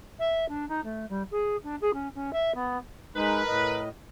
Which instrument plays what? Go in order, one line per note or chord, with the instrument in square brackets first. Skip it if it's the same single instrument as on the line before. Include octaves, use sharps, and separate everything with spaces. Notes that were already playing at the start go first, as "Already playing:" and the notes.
[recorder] E5
D4
D#4
A3
G3
G#4
D4
G#4
C#4
C#4
E5
B3
[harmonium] G#3 D#4 [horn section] A#4 B4
[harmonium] A2 D#5